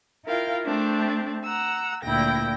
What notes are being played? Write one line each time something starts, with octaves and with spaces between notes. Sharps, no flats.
E4 F4 A#4 F5 G5
A3 C4 D4
F#5 A#5 E6
D2 A#2 E4 G5 A#6